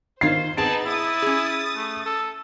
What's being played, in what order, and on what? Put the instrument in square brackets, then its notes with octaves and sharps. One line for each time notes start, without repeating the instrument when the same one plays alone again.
[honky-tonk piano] D#3 C7 [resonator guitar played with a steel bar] F4 C#5 F5 [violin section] C5
[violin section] B3 D#4 [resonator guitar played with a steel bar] C4 G#4 [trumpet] A5 [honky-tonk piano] D7
[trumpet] E4 [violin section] D#6 A6
[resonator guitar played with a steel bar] C#4 G#4
[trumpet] A3
A4